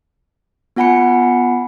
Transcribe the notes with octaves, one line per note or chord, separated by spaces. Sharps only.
B3 F4 F#5 G#5 B5 C#7